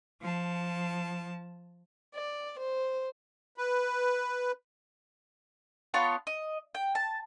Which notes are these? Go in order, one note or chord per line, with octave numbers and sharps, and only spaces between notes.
F3 A5
D5
C5
B4
B3 F4 C#5 A5
D#5
G5
A5